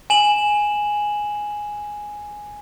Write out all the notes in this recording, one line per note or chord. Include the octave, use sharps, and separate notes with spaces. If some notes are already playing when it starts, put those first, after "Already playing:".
G#5 E7 F#7